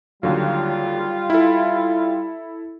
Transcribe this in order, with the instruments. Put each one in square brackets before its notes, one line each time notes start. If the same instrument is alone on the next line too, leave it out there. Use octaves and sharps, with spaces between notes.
[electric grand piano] D#2 D3 F#3 [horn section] G3 F4
[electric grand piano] E4 A4